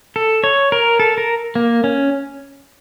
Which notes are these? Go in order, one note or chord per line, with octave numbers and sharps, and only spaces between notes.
A4
C#5
A#4
A4
A#4
A#3
C#4